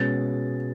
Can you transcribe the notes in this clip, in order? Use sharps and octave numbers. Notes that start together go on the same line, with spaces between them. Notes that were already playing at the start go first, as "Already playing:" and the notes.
Already playing: B2 G#3 C#4 A6